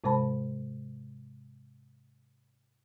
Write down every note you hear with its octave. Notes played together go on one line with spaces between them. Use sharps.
G#2 C3 G#3 C5 A5 B5